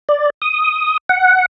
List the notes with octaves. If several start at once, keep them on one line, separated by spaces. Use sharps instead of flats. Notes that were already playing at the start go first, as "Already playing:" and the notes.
D5
D#6
F#5